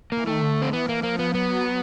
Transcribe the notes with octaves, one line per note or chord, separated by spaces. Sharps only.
E3 A#3
D#3 A3
D3
C4
E3 B3
A#3
F3 A#3
B3
F#3 B3